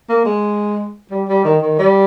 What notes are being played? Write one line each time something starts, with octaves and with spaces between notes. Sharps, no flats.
A#3
G#3
G3
G3
D#3
D#3
G3